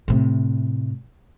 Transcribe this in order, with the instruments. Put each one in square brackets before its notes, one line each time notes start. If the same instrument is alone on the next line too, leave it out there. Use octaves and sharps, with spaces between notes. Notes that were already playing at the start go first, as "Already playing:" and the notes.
[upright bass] A2 C3